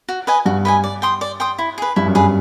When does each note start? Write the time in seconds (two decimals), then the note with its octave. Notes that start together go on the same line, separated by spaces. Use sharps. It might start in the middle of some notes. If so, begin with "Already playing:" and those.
0.09 F#4
0.27 B4 D#5 G#5
0.46 G2 F#4
0.65 B4 D#5 G#5
0.84 D5
1.02 G5 C6 D#6
1.21 D5
1.40 G5 C6 D#6
1.58 E4
1.78 G#4 B4
1.96 G2 E4
2.06 F#2
2.15 G2 G#4 B4